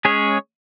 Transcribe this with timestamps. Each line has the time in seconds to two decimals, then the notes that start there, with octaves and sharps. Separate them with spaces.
0.05 G#3 C#4 G#4 C#5